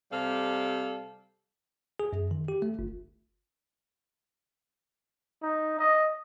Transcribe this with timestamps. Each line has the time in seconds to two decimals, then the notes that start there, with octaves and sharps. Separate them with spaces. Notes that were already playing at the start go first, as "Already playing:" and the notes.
0.11 C3 G3 A4 F5
2.00 G#4
2.13 F#2
2.31 D#3
2.48 G4
2.62 A3
2.79 G1
5.42 D#4
5.79 D#5